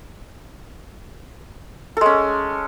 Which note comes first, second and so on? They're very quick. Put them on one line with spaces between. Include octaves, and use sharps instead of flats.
A4 G#3 C#4